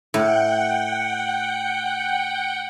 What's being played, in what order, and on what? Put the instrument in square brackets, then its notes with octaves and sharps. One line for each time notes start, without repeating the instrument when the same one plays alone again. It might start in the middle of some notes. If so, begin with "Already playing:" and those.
[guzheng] A2 [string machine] F#5 G5